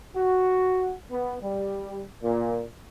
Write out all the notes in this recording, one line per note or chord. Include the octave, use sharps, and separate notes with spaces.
F#4
B3
G3
A#2